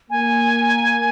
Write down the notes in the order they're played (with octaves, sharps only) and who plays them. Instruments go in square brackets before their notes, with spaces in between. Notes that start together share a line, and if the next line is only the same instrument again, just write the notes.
[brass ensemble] A#3 [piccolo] G#5